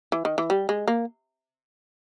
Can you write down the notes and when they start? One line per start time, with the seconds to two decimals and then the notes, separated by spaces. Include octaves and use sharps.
0.12 E3
0.25 D#3
0.38 E3
0.50 G3
0.69 G#3
0.88 A#3